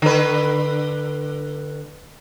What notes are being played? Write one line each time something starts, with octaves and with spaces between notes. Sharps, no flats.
D3 B4